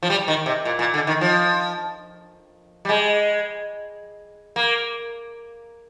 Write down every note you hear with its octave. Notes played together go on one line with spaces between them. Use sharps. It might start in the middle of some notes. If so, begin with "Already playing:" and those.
F3
G3
D#3
C3
A#2
A#2
D3
D#3
F3
G3
G#3
A#3